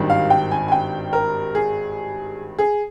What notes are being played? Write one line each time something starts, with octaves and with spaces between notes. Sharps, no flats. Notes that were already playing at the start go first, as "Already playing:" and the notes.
Already playing: G#1 G2 D#3 G3
F5
G5
G#5
G#5
G5
A#4
G#4
G#4